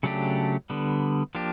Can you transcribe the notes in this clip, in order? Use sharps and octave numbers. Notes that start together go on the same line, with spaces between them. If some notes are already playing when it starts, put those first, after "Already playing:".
C#3 F#3 A3 D4 G4
D3 G3 B3
F3 A#3 D4 G4